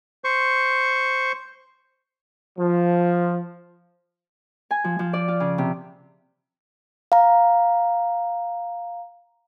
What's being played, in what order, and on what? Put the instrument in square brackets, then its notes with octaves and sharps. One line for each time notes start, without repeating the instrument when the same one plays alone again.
[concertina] C5 C#6
[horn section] F3
[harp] G#5
F3
F3
D5
F4
C#3
C3
[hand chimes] F5 A#5